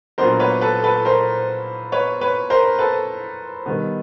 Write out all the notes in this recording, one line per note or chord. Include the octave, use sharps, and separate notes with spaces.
A#2 F#3 B3 D4 A#4 C5
B4 C#5
A4 B4
A4 B4
A#4 C5
B4 C#5
B4 C#5
A#4 C5
A4 B4
D#3 G3 B3